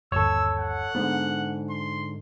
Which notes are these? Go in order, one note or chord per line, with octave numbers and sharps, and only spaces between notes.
G1 D#2 A4 C#5 E6
F#5
G#2 D3 B3
C6